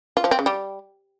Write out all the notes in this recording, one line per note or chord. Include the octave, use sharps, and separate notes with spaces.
F4
F3
C4
C#3
G3